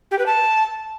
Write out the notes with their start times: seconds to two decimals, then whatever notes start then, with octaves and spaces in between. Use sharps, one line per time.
0.11 G4
0.19 B4
0.26 A5